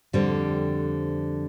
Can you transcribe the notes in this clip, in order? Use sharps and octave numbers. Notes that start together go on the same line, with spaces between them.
F2 D3 G3 C4